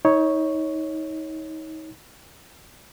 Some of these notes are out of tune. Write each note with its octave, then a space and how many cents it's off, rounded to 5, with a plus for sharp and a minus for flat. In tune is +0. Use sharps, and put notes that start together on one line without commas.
D#4 +30 C#5 +0